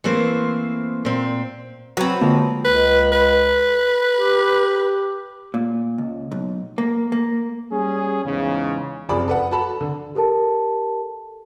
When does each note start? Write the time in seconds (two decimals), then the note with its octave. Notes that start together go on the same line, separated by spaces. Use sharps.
0.04 E3 A3 A#3 C4 C5
1.05 A#2 C4
1.97 F#3 B3 C4 B4 C#5
2.21 D3 F3 G#3 A#3 A#4
2.65 C#2 B4
3.12 B4
4.17 G4
5.54 A#2
5.98 C#2
6.31 B1
6.78 A#3
7.12 A#3
7.71 G3 C#4 G#4
8.24 E2 G#2 C#3
9.09 F#1 F2 F3 G#4 D5 B5
9.28 A4 B4 F#5
9.51 F#4 A4 A5 B5
9.81 D3
10.15 G4 A4 A#4 A5